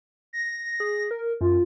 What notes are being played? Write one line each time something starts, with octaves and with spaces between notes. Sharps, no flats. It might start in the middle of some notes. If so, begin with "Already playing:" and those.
A#6
G#4
A#4
F#2 F4